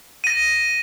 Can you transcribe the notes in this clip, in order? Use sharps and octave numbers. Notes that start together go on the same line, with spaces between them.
A#6 D#7